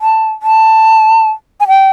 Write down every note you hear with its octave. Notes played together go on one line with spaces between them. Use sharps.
A5
A5
G#5
G5